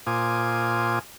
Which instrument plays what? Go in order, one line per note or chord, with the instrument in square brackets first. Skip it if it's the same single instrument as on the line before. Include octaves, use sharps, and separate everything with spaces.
[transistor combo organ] A#2 F4 C5 G#5 D6 D#6